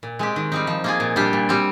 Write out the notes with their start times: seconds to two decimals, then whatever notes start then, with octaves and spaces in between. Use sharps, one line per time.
0.03 A#2
0.19 G#3 C4 G4
0.36 D#3
0.52 G3 C4 D#4
0.67 F3
0.84 A#3 F4 G#4
1.00 A#2
1.16 G3 D4 G4
1.33 A#2
1.49 G3 C4